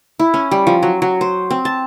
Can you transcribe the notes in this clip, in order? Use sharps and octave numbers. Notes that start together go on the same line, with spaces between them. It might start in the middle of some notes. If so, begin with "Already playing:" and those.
E4
C#4
G3
F3
F#3
F#3
C5
C4
A5